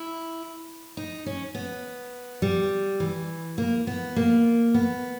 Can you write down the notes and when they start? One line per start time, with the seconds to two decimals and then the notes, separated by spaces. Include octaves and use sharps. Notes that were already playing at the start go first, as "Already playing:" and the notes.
Already playing: E4
0.97 D#4
1.26 C#4
1.55 B3
2.42 G3
3.00 E3
3.58 A#3
3.87 B3
4.16 A#3
4.74 B3